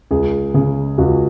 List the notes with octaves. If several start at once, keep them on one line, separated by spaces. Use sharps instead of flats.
C#2 G#4
C#3 G#4
C#2 F#4